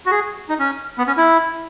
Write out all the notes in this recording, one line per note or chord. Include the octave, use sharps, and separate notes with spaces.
F#4
G#4
D#4
C#4
B3
C#4
E4